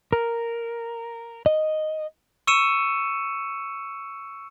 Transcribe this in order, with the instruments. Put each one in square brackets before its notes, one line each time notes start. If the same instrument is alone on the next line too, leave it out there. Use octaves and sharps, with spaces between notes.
[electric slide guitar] A#4
D#5
[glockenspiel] C#6 E6 C#7 D#7 E7